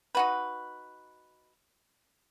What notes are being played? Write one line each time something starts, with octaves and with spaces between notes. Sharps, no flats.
D#4 F#4 B4